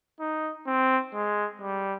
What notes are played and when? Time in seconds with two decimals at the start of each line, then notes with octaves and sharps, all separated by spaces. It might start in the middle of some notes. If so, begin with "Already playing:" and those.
0.20 D#4
0.67 C4
1.14 G#3
1.62 G3